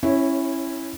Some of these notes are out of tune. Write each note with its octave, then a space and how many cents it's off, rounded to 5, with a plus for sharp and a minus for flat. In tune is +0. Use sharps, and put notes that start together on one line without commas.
C#4 -25 E4 +0 C#5 +0